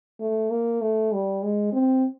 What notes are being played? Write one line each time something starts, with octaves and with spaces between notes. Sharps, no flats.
A3
A#3
A3
G3
G#3
C4